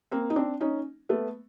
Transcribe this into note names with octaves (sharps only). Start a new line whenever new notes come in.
A#3 C4
D#4
C4 D4
C#4 D#4
A3 B3